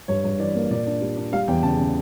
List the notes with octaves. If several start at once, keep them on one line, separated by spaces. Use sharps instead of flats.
G2 C#5
G2
E3 D5
A#3
A#2 D5
D4
G3
D4
G3 F5
E2 G5
C#3 A5
C#3